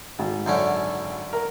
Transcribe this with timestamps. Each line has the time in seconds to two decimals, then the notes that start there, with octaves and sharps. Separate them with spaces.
0.19 G#1
0.46 F#2 D3 C#4
1.33 A#4